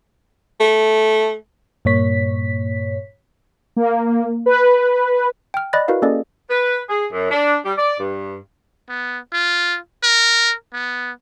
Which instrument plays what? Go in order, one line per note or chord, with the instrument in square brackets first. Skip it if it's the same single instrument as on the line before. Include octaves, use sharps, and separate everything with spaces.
[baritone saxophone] A3
[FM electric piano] G2 A#2 A#3 C#5 B6
[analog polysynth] A#3
B4
[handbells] G5 F6
D5 D#5 B5 F#6 A6 A#6
E4 F#4 A#4 B4 F5
A#3 C#4 G#4 A4 D5 D#5
[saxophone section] B4
G#4
F#2
D4
G3
D5
G2
[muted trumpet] B3
F4
A#4
B3